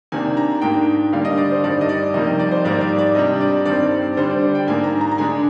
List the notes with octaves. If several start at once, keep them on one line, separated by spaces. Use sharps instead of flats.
C3 D#3 A#3 D4 G#5
A#5
G#2 D#3 A#3 D4 G5
D3 G3 A#3 D4 F5
D#5
D5
C5
G2 D#3 G3 D5
D#5
D5
F2 C3 D#3 G3 A#3 D#5
D#5
D5
C5
G#2 D#3 G3 A#3 D5
D5
D5
C3 G3 D4 D#5
D5
G2 D#3 G3 C4 D5
D3 G3 D4 C5
D5
G5
G#2 G3 A#3 D4 G#5
A#5
A#5
A#5
D3 G#3 D4 G#5